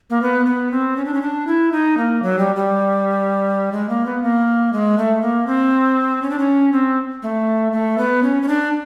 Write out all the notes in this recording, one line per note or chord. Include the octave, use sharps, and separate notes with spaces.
A#3
B3
B3
C4
C#4
D4
C#4
D4
E4
D#4
A#3
F#3
G3
G3
G#3
A#3
B3
A#3
G#3
A3
A#3
C4
C#4
D4
C#4
C4
A3
A3
B3
C#4
C#4
D4